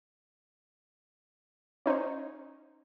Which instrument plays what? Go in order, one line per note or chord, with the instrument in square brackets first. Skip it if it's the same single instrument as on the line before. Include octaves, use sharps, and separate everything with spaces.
[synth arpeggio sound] C#4 D#4 C5 C#5